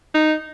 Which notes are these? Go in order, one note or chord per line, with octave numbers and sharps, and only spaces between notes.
D#4